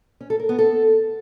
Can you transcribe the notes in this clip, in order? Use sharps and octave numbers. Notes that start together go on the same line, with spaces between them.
C#4
A4
A#4
B3
A4